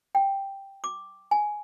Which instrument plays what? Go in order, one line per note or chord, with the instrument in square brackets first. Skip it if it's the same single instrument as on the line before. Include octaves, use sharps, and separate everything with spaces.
[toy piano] G5
D6
G#5